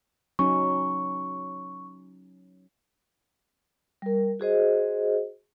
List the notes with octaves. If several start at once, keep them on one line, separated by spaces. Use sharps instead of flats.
F#3 C#4 D#4 C#6
G3 A#4
F#4 G#4 C5 D#5